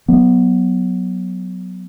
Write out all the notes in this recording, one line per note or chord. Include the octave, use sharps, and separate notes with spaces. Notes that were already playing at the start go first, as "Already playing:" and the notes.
F#3 B3